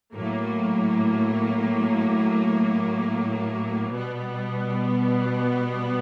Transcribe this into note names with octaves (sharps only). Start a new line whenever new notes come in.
A2 F#3 A#3
B2 G3 B3